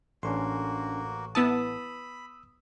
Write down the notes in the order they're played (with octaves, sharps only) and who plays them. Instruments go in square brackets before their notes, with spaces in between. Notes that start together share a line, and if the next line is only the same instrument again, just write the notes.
[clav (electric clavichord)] A1 [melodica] A#3 F#4 [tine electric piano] C#4 D4 C6
[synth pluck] B3 E4 A5 [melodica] B5 [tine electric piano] D#6 E6